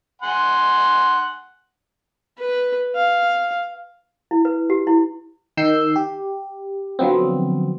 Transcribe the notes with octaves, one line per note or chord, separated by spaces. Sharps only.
F#5 G#5 C6
B4
F5
E4
B4
G4
E4
D#3 E6 G6 C7
G4
D3 F3 F#3 B3 C4